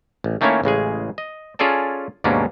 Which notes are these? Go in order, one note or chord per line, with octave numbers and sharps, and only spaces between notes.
A1
D#3 A3 A#3 C#4 E4 C#5
A1 C#3 G#3 G#4
D#5
C#4 F4 G#4 A4 D5 A5
D#2 G#2 B2 A#3 C#4 D4